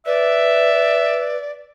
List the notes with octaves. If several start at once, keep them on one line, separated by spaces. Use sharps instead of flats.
B4 D5 E5